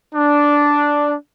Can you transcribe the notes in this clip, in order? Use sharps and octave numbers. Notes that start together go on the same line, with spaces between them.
D4